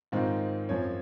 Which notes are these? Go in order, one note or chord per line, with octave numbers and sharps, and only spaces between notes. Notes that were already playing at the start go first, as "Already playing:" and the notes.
G#2 D#3 G#3 C4 F4
F#2 F3 C4 C#5